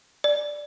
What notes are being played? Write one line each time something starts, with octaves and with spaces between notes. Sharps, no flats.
D5